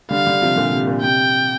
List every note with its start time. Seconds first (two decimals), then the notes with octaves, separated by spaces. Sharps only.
0.11 D3 G3 F5
0.26 D3 G3
0.42 C3 F3
0.56 A#2 D3
0.72 C3
0.87 A#2
1.02 C3 G5